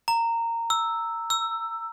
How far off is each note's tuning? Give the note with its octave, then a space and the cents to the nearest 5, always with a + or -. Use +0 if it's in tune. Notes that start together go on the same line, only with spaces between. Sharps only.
A#5 -15
E6 +0
E6 +15